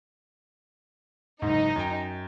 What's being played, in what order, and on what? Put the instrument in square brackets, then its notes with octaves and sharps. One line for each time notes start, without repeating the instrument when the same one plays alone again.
[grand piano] F#1 G#2 [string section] D#4
[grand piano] F#2 G5